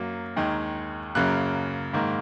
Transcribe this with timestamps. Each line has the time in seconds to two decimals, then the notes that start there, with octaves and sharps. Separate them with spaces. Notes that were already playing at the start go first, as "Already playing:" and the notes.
Already playing: F#2 F#3 A#3
0.36 D#2 D#3 G#3
1.15 F#2 C#3 A#3 F#6
1.93 G#2 D#3 A#3